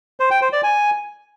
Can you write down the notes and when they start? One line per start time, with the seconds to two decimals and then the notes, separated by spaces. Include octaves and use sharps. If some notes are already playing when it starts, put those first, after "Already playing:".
0.20 C5
0.31 G5
0.42 C5
0.52 D5
0.63 G#5